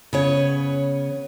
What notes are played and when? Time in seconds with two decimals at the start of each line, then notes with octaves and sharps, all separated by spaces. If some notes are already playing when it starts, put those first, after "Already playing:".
0.13 C#3 B3 C#5